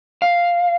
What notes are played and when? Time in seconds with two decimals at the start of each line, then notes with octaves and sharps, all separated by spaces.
0.22 F5